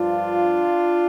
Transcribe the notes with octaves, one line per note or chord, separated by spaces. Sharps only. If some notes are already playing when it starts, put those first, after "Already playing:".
Already playing: G2 F3 D4 F4